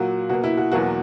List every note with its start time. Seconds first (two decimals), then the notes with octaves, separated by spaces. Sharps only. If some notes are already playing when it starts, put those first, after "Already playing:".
Already playing: A#2 F#3 A#3 F#4
0.29 B2 A#3 F#4
0.44 E4
0.57 F#4
0.72 E2 B2 F#3 A#3 F#4